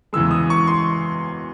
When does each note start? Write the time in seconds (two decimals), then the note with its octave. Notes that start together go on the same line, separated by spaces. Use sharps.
0.13 E2 C#3 E3 G#3 E6
0.31 D#6
0.50 C#6
0.67 C6